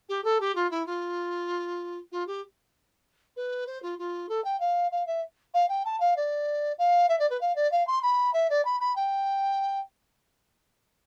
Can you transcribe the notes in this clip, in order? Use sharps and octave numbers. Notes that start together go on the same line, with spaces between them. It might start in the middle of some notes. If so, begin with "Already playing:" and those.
G4
A4
G4
F4
E4
F4
F4
G4
B4
C5
F4
F4
A4
G5
F5
F5
E5
F5
G5
A5
F5
D5
F5
E5
D5
B4
F5
D5
F5
C6
B5
E5
D5
B5
B5
G5